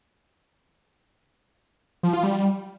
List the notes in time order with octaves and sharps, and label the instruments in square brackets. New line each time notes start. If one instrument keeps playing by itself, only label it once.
[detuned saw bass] F3
F4
G3